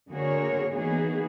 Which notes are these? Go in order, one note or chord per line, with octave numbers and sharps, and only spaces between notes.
D3 A#3 F#4 G#4 A#4 C#5
E3 A#3 B3 D#4 F#4 G#4